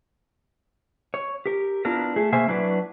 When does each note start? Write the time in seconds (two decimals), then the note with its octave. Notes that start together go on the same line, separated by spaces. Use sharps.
1.14 C#5
1.46 G4 A#4
1.85 B3 D4 E4 F4 A#4
2.16 A3 G#4 A4
2.32 B2 A#3 C5 E5 G#5
2.48 F#3 D4 E4 F#4 B4 D5